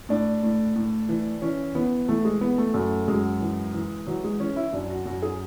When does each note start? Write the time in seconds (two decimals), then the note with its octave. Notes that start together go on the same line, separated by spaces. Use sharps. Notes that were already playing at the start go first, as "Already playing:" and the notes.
0.09 A2 D4
0.43 A2
0.76 A2
1.09 E3
1.42 E3 C#4
1.75 E3 B3
2.08 E3 A3
2.25 G#3
2.41 E3 B3
2.58 A3
2.74 F#2 A3
3.08 F#2 G#3
3.41 E3
3.74 E3
4.07 E3 F#3
4.24 G#3
4.40 E3 C#4
4.56 E4
4.73 F#2 D4
4.90 F#4
5.06 F#2 F#4
5.22 G#4